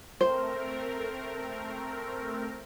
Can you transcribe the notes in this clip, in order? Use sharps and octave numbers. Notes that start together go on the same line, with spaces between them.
A3 C4 A#4 C5